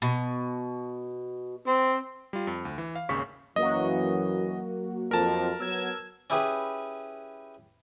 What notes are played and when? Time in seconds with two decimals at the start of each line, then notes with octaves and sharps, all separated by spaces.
0.02 B2
1.67 C4
2.33 G3 F4
2.47 F2
2.65 D2
2.78 E3
2.96 F5
3.09 G#1 D#2 C#3 C#6 B6
3.56 F#2 E3 F#3 A#3 F#4 D#5
5.11 F2 A#4 A5
5.60 F#3 B3 E6 G#6
6.30 C#4 E4 G4 G#4 B4